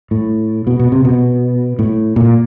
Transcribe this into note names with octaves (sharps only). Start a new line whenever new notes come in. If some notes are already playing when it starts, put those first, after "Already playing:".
A2
B2
B2
C3
B2
A2
A#2